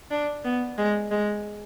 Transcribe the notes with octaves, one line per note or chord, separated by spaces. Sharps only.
D4
B3
G#3
G#3